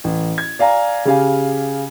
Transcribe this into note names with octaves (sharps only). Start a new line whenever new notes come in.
A1
G#6
D5 F5 G#5 A#5
C#3 G4 F5 G#5